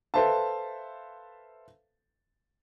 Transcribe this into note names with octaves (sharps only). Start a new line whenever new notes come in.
A4 B4 C5 E5 F5 A5